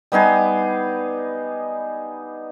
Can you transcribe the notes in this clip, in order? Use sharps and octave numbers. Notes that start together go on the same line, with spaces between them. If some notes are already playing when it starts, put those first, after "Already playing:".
G3 B3 D#4 G#4